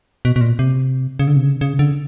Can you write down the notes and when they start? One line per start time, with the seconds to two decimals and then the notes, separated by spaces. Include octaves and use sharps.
0.25 B2
0.36 B2
0.41 A#2
0.59 C3
1.19 C#3
1.27 D3
1.36 C3
1.45 C#3
1.61 C#3
1.79 D3